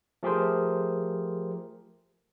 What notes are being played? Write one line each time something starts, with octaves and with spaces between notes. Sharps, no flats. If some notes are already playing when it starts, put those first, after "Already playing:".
F3 A3 G4 G#4 A#4 C5